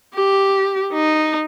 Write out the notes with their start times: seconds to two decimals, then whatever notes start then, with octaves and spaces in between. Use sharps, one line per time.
0.15 G4
0.93 D#4